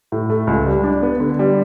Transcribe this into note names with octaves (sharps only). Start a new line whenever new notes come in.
A2
A3
C#2
G3
D4
B3
D3
G3